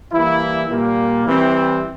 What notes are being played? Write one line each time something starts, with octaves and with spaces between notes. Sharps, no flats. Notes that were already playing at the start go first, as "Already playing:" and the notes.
E3 G3 A#3 E4
A#2 G3 A#3
E3 G3 C4